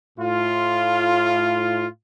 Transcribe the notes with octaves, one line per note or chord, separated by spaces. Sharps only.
A2 F4